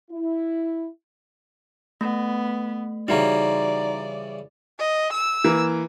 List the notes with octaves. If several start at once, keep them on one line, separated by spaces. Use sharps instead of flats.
E4
A3 B3
C#3 E3 G3 D#4 F#4 D5 A#5
D#5
E6
E3 A#3